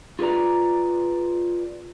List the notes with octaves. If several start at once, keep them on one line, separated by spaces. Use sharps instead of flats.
F4 G#4 B4 D5 A#5